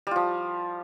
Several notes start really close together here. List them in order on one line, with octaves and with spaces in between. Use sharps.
G3 F4 F3